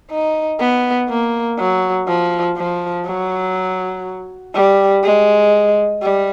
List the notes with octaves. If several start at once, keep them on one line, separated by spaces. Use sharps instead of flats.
D#4
B3
A#3
F#3
F3
F3
F#3
G3
G#3
G3